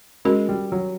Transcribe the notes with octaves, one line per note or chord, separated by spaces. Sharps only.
G#3 C#4 F#4 A#4
G3
F#3